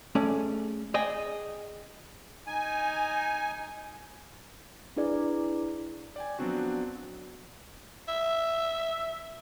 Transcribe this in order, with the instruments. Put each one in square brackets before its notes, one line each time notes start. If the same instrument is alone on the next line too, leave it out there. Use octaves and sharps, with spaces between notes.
[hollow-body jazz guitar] A3 C#4 G#4 D5
G#4 D5 D#5 G5 G#5
[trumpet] D#4 [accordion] G#5
[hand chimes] D4 E4 G#4 B4 D5
[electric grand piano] D5 G5 G#5
F3 F#3 B3 C4 D4 F#4
[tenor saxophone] E5